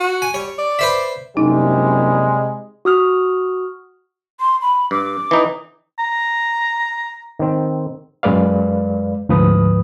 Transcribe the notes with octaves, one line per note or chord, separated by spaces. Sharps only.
F#4
G#5
G3 C#5
D5
B4 C5 E5
F#1 C3 G3 G#3 D#4
F#4 D#6 F6
C6
B5
G2 D6
E3 D#4
A#5
D#3 C4
F#2 G#3 B4 D5 F5
D2 G#2 F3 B4 D#6